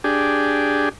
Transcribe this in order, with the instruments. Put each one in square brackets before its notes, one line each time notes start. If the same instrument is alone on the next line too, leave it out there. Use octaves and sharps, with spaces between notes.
[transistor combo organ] D4 G4 G#4